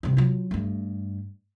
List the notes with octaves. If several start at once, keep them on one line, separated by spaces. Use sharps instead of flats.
G2 C3
F#3 F4
G2 A3